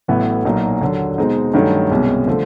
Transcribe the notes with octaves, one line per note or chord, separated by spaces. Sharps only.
A1 A2 F#3 B3 E4
B1 A#2 F#3 A#3 D#4
D#2 D3 F#3
B2 G#3 C4 D#4
G2 D#3 F#3 A3 C#4
C2 B2 G#3 C#4
D3 F3 A3